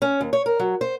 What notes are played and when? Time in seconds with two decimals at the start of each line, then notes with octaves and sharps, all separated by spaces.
0.02 C#4
0.21 D#2
0.33 C#5
0.46 A#4
0.59 F#3
0.81 C5